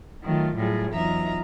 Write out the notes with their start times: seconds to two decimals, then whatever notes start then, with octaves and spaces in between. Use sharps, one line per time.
0.23 D#3 F#3 A3 F4
0.55 A2 F#3 G3 F4 G#4
0.91 E2 F#3 D#4 F4 E5 A#5